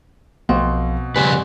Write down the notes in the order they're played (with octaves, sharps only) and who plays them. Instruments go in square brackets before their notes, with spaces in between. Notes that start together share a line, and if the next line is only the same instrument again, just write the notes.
[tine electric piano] B1 F3 F5 [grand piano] B2 [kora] C4
[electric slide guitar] F2 C#3 B4 [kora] G3 C4 C#4 [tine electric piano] G#5